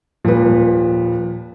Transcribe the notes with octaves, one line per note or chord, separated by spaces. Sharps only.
D#1 A#2 F3 B4